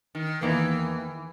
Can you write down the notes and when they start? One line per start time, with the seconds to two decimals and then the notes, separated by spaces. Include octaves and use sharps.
0.15 D#3
0.41 E2 D#3 E3 A#3 D#4